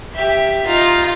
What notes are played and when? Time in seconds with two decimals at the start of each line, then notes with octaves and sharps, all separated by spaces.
0.14 G4 E5
0.67 D#4 F4